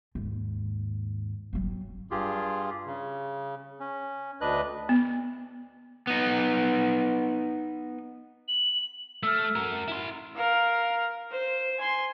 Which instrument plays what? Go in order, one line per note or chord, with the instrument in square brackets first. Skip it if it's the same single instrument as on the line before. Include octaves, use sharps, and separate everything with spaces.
[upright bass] D#2 G#2
F#3 C4
[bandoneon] G2 F4 G4 G#4
C#3
C#4
D2 D4 B4 D#5 F#6
[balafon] B3
[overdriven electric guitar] B3 D#4
[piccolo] F#7
[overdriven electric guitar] A3 [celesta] E6 F6
[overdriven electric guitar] F#4 A#4
E4 C6
[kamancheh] A#4 F5
C5
G#5 C6